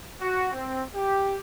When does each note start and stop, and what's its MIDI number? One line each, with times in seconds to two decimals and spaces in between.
0.21 0.52 66
0.53 0.83 60
0.95 1.37 67